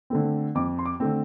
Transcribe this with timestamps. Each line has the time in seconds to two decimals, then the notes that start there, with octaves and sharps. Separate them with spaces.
0.10 D3 A3 C4
0.55 F2 D6
0.79 C6
0.85 D6
1.00 D3 A3 C4